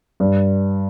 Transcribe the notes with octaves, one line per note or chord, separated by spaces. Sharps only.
G2